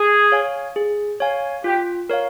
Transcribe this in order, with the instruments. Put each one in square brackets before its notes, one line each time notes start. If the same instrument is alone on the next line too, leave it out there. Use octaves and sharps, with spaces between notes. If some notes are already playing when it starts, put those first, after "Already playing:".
Already playing: [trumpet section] G#4
[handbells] C#5 F5 G#5
G#4
C#5 F5 G#5
[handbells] F4 [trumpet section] G4
[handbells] A#4 C#5 F5